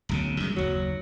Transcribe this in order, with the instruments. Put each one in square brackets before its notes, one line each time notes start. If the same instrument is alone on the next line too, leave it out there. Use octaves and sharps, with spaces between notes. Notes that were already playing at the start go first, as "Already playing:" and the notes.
[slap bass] D1 B1 C#3
F#2 D#3 G#3
[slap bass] F#1 D#2 [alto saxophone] F#3